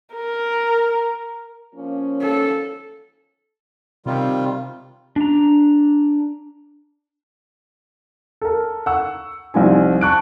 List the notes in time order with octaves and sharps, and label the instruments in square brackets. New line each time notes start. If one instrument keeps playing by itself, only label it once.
[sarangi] A#4
[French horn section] F3 A#3 C#4
[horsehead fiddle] A4
[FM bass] C3 [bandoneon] D#3 G3 F4
[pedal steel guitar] D4 A#5
[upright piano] A4 A#4
F#5 C#6 E6
C2 F3 C4 D#4 G#5
A5 C#6 F#6 D7